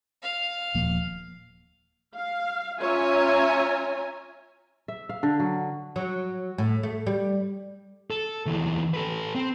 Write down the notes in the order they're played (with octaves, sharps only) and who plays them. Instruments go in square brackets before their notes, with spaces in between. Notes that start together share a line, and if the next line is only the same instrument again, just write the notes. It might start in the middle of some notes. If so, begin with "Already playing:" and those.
[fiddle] F5
[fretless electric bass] D#1 F3 A#3
[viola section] F5
C#4 F4 C#5 E5 G#5 A#5
[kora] E5
F5
D3
F#3
[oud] F#3
A2
A3
G3
[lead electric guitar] A4
D#2 E3
A4 B4
C4